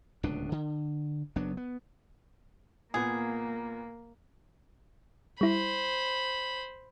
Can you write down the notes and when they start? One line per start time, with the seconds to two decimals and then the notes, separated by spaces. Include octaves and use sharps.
0.23 D1 C#2 B2 D4
0.52 D3
1.36 F#1 F#3 B3 D4
1.57 B3
2.94 A#2 A#3 B3 G#4
5.41 G3 E4 C5 B5